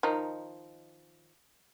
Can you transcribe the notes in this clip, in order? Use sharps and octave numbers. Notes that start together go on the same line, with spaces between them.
D#3 F3 D#4